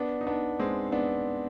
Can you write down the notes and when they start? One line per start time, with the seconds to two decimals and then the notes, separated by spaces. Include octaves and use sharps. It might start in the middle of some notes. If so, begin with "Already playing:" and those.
Already playing: B3 D4
0.21 D#4
0.27 B3 D4
0.60 G#3 C4
0.92 B3 D4